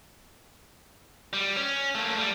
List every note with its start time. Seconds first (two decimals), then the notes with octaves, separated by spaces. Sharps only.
1.33 G3
1.57 C#4
1.95 A3 A#3
2.18 G3